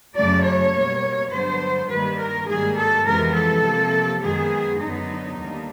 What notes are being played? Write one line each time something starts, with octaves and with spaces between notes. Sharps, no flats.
F#2 C#3 F#3 A3 D5
C#5
B2 G3 A#3
G2 D3 F#3 B3 C5
G2 D#3 G3 A#3 B4
A#4
G#2 D#3 G3 A#3 G#4
A4
F2 C3 E3 G#3 B3 A#4
A4
C3 F3 A#3
F#2 D#3 G#3 B3 G#4
F#2 D3 F#3 B3 D#4
D#2 D3 G3 A#3